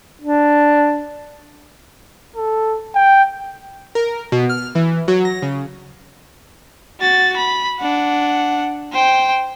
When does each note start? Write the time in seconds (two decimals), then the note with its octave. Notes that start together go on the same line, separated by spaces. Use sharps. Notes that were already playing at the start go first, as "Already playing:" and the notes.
0.21 D4
2.36 A4
2.95 G5
3.95 A#4
4.32 B2
4.49 F6
4.75 E3
5.08 F#3
5.25 A#6
5.42 C#3
7.00 F#4 A6
7.37 B5
7.79 D4 F#5
8.92 C5 G5